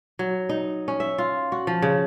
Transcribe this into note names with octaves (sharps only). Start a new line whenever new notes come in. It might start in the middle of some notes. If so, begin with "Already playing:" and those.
F#3
D#4
C#4
E5
F4
F#4
F3
C#3